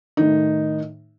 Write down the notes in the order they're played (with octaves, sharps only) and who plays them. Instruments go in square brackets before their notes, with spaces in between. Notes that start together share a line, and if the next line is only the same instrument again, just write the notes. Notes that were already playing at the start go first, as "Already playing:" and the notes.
[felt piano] A2 D#3 D#4